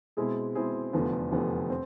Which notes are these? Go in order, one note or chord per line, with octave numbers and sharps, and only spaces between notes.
B2 G#3 C4 E4 G#4
B2 G#3 C4 E4 G#4
F1 E2 D3 F3 B3
F1 E2 D3 F3 B3
C4